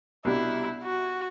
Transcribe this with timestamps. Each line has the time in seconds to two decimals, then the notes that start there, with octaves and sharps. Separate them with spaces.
0.25 C2 B2 G3 D4 E4
0.83 F#4